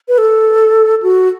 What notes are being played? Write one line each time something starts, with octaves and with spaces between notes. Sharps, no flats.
B4
A4
F#4